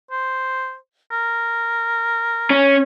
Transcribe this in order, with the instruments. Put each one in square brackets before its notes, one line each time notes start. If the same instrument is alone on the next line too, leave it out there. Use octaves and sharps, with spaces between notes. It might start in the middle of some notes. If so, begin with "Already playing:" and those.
[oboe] C5
A#4
[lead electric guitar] C#4